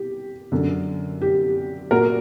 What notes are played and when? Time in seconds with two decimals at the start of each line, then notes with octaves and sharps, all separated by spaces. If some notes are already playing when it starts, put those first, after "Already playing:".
Already playing: G4
0.52 F#2 D3
1.22 G4
1.91 A#2 F#4 A#4